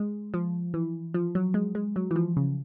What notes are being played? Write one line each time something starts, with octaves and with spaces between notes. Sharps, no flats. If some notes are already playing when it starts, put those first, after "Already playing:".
Already playing: G#3
F3
E3
F3
F#3
G#3
G#3
F#3
E3
F3
C#3